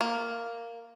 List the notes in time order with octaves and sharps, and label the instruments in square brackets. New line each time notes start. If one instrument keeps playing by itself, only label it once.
[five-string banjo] A#3